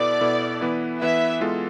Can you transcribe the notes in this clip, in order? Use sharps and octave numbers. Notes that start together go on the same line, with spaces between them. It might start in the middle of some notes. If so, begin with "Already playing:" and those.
Already playing: B2 B3 E4 A4 D5
B2 B3 E4 A4
E3 B3 E4 B4
E3 B3 E4 B4 E5
E3 G#3 B3 F4 A4